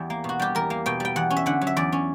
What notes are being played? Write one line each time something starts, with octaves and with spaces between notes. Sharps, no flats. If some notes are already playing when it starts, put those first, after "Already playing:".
Already playing: E2 G3 G4
A#3
B2 F#4
G3 G4
E2 A#4
A#3
B2 G5
G3 G5
E2 F#5
C#4
E5
D3 F#5
F#3
E5
E2 D5
C#4